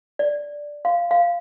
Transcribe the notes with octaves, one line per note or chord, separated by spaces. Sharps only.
D5
F5
F5